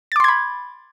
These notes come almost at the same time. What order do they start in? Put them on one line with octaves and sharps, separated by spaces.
A6 D6 C6 G#6 B5